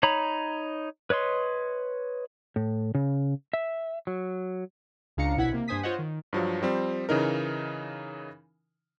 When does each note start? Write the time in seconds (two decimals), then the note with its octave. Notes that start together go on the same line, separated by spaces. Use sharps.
0.03 D#4 C#5 A#5 B5
1.10 B4 C#5 D#5 C6
2.56 A2
2.95 C#3
3.53 E5
4.07 F#3
5.17 C#2 C#3 D4 F5 A#5 C#7
5.36 A#1 B2 E4 F#5 G#6 B6
5.52 C3 A#3
5.68 G2 D4 C5 G#5 D#6 B6
5.83 F4 C5 C#5 D#5 F#5
5.99 D#3
6.33 G2 F3 F#3
6.62 F3 G3 C4
7.09 C#3 E3 D#4 A#4